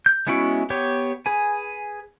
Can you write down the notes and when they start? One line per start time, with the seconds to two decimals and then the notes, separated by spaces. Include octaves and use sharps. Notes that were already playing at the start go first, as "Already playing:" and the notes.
0.06 G6
0.27 G#3 B3 C#4 E4 F#4
0.70 B3 G4 C#5
1.26 G#4 B4 G#5